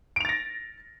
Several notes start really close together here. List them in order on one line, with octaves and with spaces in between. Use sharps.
D7 F7 A6 A#6